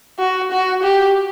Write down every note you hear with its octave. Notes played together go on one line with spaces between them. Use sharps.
F#4
F#4
G4